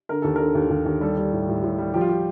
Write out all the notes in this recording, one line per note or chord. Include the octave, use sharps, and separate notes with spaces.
D3 A#4
D#2 A4
D3 A#4
D#2
D#2
D#2
G3 A4
G3
A2
A2
A2
G3
F3 G4
F4
G4